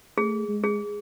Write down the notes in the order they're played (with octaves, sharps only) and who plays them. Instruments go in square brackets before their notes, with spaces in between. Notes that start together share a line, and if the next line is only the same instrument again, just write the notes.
[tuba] A3 [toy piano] G#4
[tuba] G#3
[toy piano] G#4